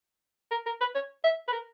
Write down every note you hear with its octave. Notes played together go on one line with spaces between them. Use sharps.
A#4
A#4
B4
C#5
E5
B4
A#4